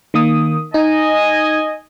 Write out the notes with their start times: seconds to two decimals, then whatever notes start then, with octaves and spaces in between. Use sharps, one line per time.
0.14 D#3 A#3 D#6
0.74 D#4 D#5 G#5